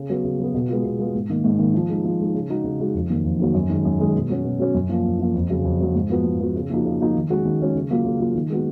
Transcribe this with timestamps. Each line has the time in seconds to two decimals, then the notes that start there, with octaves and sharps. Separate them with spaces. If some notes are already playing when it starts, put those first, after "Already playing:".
Already playing: C#3
0.10 F#3 B3
0.24 C#3
0.39 F#3 B3
0.54 B2
0.69 G#3 B3 F4
0.85 B2
0.99 G#3 B3 F4
1.15 G#2
1.30 D#3 A#3
1.44 G#2
1.59 D#3 A#3
1.74 F3
1.89 G#3 D#4
2.04 F3
2.19 G#3 D#4
2.34 C#3
2.49 G#3 D#4 F#4
2.64 C#3
2.79 G#3 D#4 F#4
2.94 F2
3.10 D#3 F#3 A#3
3.24 F2
3.39 D#3 F#3 A#3
3.54 F#2
3.70 D#3 G#3
3.85 F#2
4.00 D#3 G#3
4.14 B2
4.30 F#3 C#4 F#4
4.44 B2
4.60 F#3 C#4 F#4
4.74 F#2
4.89 F3 A#3 F4
5.05 F#2
5.20 F3 A#3 F4
5.35 F2
5.49 C#3 F#3
5.65 F2
5.80 C#3 F#3
5.95 G#2
6.10 F3 B3 F#4
6.24 G#2
6.40 F3 B3 F#4
6.55 C#3
6.70 F3 A#3 D#4 F#4
6.85 C#3
7.00 F3 A#3 D#4 F#4
7.15 D#3
7.30 G#3 C#4 F#4
7.45 D#3
7.60 G#3 C#4 F#4
7.75 C#3
7.90 F#3 A#3 F4
8.05 C#3
8.20 F#3 A#3 F4
8.35 D#3
8.50 G#3 B3 F#4